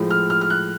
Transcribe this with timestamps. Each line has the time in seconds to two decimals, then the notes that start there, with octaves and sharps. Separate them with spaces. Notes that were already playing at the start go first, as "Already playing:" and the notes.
Already playing: A2 F3 G#3
0.10 F6
0.30 F6
0.41 F6
0.50 F#6